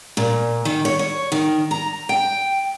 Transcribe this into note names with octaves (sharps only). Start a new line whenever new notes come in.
A#2
D#3
C#5
C#5
D#3
A#5
G5